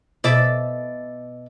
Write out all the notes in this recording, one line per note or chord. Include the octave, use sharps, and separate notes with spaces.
B2 D5 E5